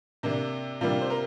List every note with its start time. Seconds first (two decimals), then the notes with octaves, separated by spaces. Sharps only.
0.23 C3 A#3 D4
0.81 C3 G3 A#3 D4 F4
1.01 C5
1.10 A#4